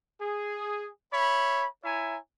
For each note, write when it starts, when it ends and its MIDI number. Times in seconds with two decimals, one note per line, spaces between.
0.21 0.88 68
1.13 1.66 73
1.13 1.66 76
1.13 1.66 83
1.84 2.17 64
1.84 2.17 73
1.84 2.17 76
1.84 2.17 80
1.84 2.17 82